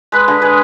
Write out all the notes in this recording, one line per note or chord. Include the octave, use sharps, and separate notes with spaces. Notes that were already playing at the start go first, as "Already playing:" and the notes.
G#3 B4
D3 G#4
G#3 B4